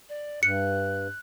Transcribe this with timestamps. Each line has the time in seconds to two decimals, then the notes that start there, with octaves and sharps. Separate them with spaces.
0.09 D5
0.43 G2 F#6 C#7